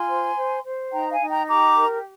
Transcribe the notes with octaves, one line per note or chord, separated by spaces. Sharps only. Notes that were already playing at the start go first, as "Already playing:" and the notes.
Already playing: F4 G#5 C6
C5
C5
C5
D#4 G5 A#5
F5 G#5
D#4
G5 A#5
G4 A#5 D6
A#4